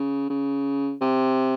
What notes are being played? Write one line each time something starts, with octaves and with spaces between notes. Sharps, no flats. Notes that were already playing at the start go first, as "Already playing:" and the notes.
Already playing: C#3
C#3
C3